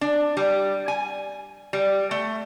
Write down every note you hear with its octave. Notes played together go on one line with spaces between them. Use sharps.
D4
G3
G#5
G3
A3